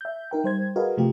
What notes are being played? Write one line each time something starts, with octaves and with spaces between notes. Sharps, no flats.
E5 G6
D#4 A#4 G5
G3 C5 G#6
F#4 G#4 A#4 B4 D#5 F5
C3 F3 A3 F4 G4